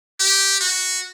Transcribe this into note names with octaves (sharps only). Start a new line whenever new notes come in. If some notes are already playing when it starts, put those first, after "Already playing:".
G4
F#4